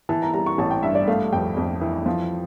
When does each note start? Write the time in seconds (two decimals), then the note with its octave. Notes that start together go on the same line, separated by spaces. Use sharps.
0.09 E3 A5
0.22 A#5
0.34 G3 A#5
0.46 C#6
0.58 A1 A5
0.71 G5
0.83 G2 E5
0.95 D5
1.08 A3 F5
1.33 F2 G5
1.57 F2
1.81 E3
2.06 F3